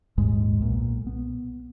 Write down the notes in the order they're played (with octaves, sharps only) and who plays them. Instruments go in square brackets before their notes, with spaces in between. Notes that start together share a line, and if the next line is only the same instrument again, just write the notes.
[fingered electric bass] A#1 D#2 G#2 G#3
B1 A#2
B3